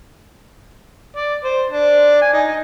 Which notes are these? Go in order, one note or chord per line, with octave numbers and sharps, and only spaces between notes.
D5
C5
D4
G#5
D#4